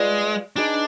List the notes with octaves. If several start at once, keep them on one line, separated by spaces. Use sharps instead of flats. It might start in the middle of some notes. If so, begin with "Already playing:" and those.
Already playing: G#3 F4 B4 D5
D4 D#4 G#4 B4 D#5